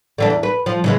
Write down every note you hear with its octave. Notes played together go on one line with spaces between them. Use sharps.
D3 E3 D4
E2
B4
F3
C#3 E3 G#3